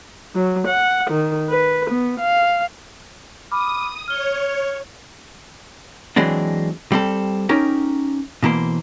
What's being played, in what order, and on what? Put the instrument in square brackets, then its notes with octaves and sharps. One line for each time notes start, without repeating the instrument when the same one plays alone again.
[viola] F#3
F#5
D#3
B4
B3
F5
[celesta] B5 D6 F6 [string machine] D#6
[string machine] C#5 [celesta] F6 G7
[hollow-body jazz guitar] E3 F#3 G#3 C4 D4
G3 C4 A4
C#4 D#4 G4 A#4
B2 E3 A#3 C5